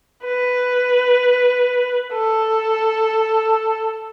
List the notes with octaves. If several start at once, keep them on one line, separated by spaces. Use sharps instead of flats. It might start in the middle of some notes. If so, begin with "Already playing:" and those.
B4
A4